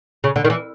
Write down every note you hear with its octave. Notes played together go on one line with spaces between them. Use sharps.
C#3
D3
D#3
E3